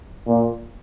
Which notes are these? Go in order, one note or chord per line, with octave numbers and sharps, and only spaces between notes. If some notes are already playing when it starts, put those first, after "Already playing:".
A#2